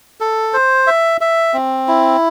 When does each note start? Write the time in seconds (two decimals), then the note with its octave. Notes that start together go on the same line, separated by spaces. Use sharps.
0.21 A4
0.53 C5
0.87 E5
1.21 E5
1.54 C4
1.88 E4